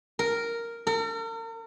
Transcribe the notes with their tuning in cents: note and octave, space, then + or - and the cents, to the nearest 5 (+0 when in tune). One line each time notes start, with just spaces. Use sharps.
A#4 -5
A#4 -45